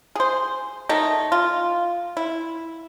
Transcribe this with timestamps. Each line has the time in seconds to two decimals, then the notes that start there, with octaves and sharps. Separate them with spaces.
0.15 G#4 C5
0.89 D#3 A3 D#4
1.32 F4
2.17 E4